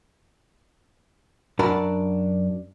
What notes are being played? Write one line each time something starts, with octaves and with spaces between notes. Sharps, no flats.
F#2 D4 F#4 A#4 A5 B5